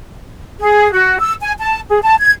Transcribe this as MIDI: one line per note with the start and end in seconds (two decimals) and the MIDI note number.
0.60 0.91 68
0.92 1.18 66
1.19 1.33 88
1.42 1.52 80
1.59 1.80 81
1.89 1.98 68
2.02 2.15 81
2.20 2.32 92